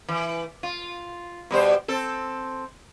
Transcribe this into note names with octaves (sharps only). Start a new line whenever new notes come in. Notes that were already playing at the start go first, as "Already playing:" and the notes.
E3
F4
B2 G3 C5
C4 A4